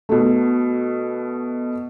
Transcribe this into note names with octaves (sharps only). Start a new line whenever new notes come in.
B2 A3